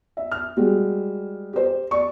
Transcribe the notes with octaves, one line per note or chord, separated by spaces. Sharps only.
E5
F6
G3 G#3 F#4
G4 C5
D5 C#6